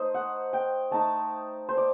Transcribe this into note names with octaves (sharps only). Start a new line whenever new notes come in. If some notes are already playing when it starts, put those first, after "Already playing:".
Already playing: A3 D#4 C5 D#5
F#5
G5
A3 D#4 A5
C5
D5